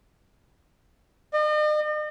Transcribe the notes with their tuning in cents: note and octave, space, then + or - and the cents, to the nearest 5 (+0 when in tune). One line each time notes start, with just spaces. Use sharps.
D#5 -45